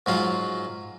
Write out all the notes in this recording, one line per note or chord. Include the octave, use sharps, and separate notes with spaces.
G#2 F#3 F4